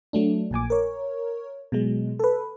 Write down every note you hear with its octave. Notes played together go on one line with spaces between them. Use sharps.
F#3 A3 D4
A#1 A#2 G#5 D6
A#4 C#5
B2 F#3 G#3
A4 B4